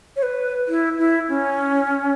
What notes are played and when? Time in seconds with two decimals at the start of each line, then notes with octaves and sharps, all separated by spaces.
0.16 C#5
0.23 B4
0.68 E4
0.98 E4
1.29 C#4